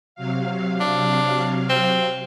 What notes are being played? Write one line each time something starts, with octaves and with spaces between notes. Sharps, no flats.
C3 F#3 F5
D4
C4